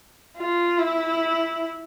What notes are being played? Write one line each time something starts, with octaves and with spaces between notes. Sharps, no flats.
F4
E4